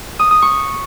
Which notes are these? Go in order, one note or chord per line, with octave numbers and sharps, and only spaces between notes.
D#6
D#6
C#6